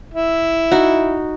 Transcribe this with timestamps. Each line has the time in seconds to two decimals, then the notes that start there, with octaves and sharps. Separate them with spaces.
0.14 E4
0.71 D#4 F#4